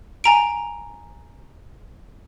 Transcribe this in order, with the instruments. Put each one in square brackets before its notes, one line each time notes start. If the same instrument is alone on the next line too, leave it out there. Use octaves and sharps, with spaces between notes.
[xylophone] G#5 A#5 D7